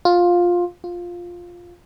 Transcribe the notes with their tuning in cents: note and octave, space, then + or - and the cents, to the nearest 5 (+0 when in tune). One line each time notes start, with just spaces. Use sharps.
F4 +10
F4 +5